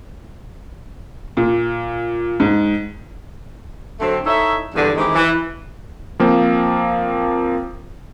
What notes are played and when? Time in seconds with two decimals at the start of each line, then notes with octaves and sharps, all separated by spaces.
1.37 A#2
2.40 G#2
4.00 D3 F#3 A3 C4
4.25 D#4 E4 A4 C#5 E5
4.74 E2 G2 D3
4.96 D#3 E3 G#3 C4 E4 G4
5.15 E3
6.19 F3 A#3 C4